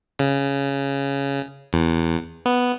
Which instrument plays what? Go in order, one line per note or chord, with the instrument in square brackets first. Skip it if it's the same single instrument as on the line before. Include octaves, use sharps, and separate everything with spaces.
[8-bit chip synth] C#3
E2
B3